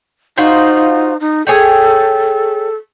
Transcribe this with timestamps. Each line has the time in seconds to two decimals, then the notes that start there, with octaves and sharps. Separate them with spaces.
0.38 D#4 F4 F#4 C5
1.20 D#4
1.47 G#4 A4 C#5 G5